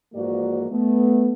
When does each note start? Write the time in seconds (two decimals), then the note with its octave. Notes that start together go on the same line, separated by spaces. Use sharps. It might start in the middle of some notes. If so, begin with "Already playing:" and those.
0.14 G#2 E3 F3 A#3 F#4 D5
0.71 A3 B3